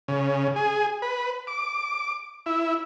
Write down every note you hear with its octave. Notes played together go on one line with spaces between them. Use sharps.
C#3
G#4
B4
D6
E4